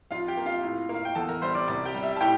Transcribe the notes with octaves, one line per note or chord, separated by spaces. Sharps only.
F2 F4 F5
G4 G5
A#3
F4 F5
A2
A#3
F5
G5
E2 A4 A5
A#4 A#5
G3 C5 C6
D5 D6
C2 D5 D6
G4 G5
G3
E5
A5
A2 G4 G5